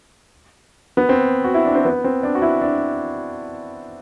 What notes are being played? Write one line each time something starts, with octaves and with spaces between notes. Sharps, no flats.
B3
C4
F#4
E4
D4
C4
B3
C4
D4
F#4
E4
D4